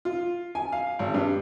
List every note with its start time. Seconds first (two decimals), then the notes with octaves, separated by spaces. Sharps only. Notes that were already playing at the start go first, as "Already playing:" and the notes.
0.05 F4
0.55 G#5
0.72 F5
0.99 G#1
1.14 G2